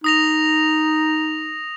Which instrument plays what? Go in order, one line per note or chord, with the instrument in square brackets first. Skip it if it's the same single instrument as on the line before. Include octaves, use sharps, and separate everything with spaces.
[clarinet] D#4 [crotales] D#6 A#6 F7